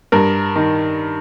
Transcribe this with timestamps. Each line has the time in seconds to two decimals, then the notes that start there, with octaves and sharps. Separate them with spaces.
0.12 G2 A#4
0.56 D#3